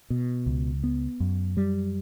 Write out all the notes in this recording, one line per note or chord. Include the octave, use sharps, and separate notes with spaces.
B2
C#2
B3
F#2
G3